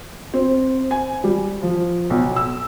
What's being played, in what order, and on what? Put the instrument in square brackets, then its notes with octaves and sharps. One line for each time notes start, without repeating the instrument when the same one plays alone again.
[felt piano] C4
G#5
G3
F3
B1
E6